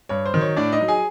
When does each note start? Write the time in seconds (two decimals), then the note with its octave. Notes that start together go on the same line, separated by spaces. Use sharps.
0.09 G2 C#5
0.26 C5
0.34 D#3 F#3
0.41 C#5
0.57 A2 D4 D5
0.72 D#4 D#5
0.81 F#3
0.88 G#4 G#5